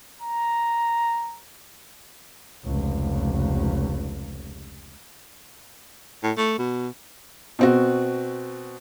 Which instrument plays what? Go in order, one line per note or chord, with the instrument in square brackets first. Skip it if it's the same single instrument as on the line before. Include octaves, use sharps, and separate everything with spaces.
[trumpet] A#5
[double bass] F1 C#2
[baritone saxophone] A2
A3
B2
[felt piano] B2 C4 F#4